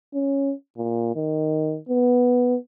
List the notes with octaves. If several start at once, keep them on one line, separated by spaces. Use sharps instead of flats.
C#4
A#2
D#3
B3